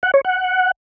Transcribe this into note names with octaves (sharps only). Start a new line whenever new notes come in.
F#5
C#5
F#5